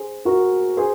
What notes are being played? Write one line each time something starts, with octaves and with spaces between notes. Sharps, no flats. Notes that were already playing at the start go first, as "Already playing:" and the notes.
Already playing: G#4 C5
F#4 A#4
G#4 C5